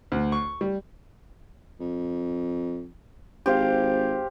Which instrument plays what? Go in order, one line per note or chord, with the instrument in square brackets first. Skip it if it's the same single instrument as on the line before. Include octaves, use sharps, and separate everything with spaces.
[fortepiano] D2
C#6
G3
[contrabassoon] F2
[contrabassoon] G#1 [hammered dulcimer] G4 C5 F5